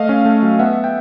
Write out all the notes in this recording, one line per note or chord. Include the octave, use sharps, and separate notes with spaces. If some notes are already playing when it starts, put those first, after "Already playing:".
Already playing: A3 D#5 F5
C#4
A3
F#3
B3 E5 F#5
G5